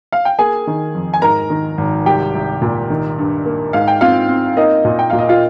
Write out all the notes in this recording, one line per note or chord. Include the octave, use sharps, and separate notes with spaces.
F5
G5
A#3 G#4 G#5
D#3
F2
G#5
G#2 A#4 A#5
D#3
G#1
C2 G4 G5
C2
A#2
D#3
G2
A#3
G#2 F5
G5
C4 F4 F5
C4
A#3 D#4 D#5
A#2
G5
A#2 F5
D#5
F4 F5